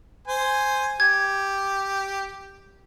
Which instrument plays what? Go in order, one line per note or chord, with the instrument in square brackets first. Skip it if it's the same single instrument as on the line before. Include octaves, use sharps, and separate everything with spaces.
[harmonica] C5 G#5
[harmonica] G4 [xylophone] G#6